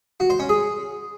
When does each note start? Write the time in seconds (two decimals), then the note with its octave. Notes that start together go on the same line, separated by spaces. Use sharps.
0.20 F#4
0.30 C5
0.39 C#4
0.49 G#4